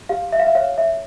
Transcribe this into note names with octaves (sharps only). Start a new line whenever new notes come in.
G4 F5
E5
F5
E5
C#5 F5
E5